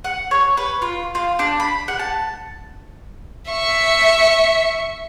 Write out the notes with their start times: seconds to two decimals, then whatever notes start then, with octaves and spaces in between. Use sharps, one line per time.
0.04 F#5
0.31 C#5
0.57 B4
0.82 F4
1.15 F4
1.39 D4
1.60 B5
1.88 F#5
1.99 A5
3.51 E5 C#6